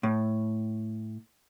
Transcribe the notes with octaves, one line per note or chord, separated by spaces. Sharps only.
A2